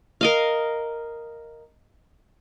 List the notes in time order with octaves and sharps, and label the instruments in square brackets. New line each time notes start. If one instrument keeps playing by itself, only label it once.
[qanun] A#4 D#5 F5